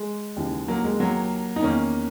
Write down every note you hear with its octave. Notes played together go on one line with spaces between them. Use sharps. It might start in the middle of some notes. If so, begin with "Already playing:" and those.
Already playing: G#3
D#2 C#3 E3
F#3 A#3
G#3
F#3 A#3
D#4
E2 D#3 A#3 C#4